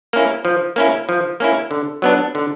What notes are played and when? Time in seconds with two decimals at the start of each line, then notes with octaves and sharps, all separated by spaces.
0.13 A#3 C#4 E4
0.45 F3
0.76 A#3 C#4 E4
1.09 F3
1.40 A#3 C#4 E4
1.71 D3
2.02 F#3 B3 D4
2.35 D3